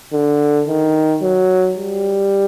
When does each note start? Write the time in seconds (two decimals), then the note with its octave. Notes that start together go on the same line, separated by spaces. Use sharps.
0.13 D3
0.67 D#3
1.22 F#3
1.78 G3